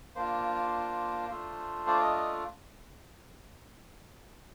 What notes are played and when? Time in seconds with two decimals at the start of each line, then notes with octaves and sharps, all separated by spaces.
0.16 A#3 D4 F4 C5
1.29 A3 D4 F4
1.87 D5
2.01 D#5
2.16 D#5